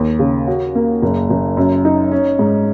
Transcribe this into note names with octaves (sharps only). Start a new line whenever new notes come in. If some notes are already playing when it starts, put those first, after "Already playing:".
Already playing: D#2
C#3
F#4
A#3
F#1
F#1
F#2
D#4
C#4
G#2